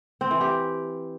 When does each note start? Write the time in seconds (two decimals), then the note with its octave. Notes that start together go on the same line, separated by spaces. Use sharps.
0.21 C4
0.31 E3
0.41 G4